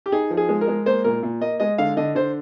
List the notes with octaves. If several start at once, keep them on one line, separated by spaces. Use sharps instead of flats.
G4
D#4 G#4
F3
G#4
G#3
A#4
G#3
A#3 C5
A#2 A#4
A#2
A#3 D#5
G#3 D#5
D3 F5
D3 D#5
D3 C5